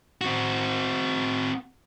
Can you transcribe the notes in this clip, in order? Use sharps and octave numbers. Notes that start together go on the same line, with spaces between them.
C4 F#4